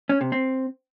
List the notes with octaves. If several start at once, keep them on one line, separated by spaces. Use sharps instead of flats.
C#4
C3
C4